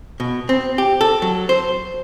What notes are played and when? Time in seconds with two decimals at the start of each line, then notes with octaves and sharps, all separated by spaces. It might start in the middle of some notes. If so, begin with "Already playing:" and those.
0.20 B2
0.49 C4
0.78 G4
1.01 A4
1.22 F#3
1.49 C5